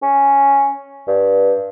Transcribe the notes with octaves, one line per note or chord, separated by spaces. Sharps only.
C#4
G2